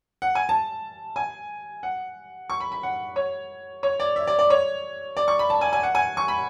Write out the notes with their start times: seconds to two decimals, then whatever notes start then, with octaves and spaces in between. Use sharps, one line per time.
0.22 F#5
0.35 G#5
0.49 A5
1.16 G#5
1.83 F#5
2.50 C#6
2.60 B5
2.72 B5
2.83 F#5
3.16 C#5
3.83 C#5
4.00 D5
4.16 E5
4.27 D5
4.39 D5
4.50 C#5
5.17 D5
5.28 C#6
5.39 B5
5.50 A5
5.61 G#5
5.73 G#5
5.83 F#5
5.95 G#5
6.17 C#6
6.28 B5